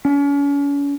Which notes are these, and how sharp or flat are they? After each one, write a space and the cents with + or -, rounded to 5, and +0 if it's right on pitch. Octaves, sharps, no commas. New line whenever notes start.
C#4 +40